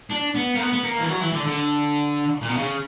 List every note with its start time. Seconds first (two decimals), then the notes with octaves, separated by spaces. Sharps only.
0.10 D4
0.35 B3
0.55 A#3
0.60 B3
0.72 B3
0.83 A#3
0.98 E3
1.09 F#3
1.20 E3
1.33 D3
1.46 D3
2.42 A#2
2.49 B2
2.57 C#3